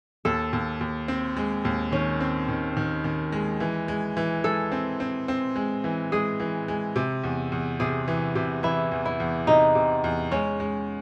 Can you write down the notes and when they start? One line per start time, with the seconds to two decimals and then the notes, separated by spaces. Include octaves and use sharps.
0.25 D#2 A4
0.53 D#2
0.81 D#2
1.08 C4
1.37 G#3
1.65 D#2
1.92 D#3 C#4
2.21 C4
2.49 D#3
2.77 D#3
3.04 D#3
3.32 G#3
3.60 E3
3.88 G#3
4.17 E3
4.44 G#3 A4
4.72 C4
5.00 C4
5.28 C4
5.56 G#3
5.84 E3
6.12 G#3 G#4
6.40 E3
6.68 G#3
6.96 C3
7.24 E2
7.52 E2
7.80 C3 G#4
8.08 E3
8.36 C3
8.63 E3 E4
8.92 E2
9.05 E4
9.20 E2
9.47 C3 D#4
9.75 C3
10.04 E2
10.31 G#3 C#4
10.60 G#3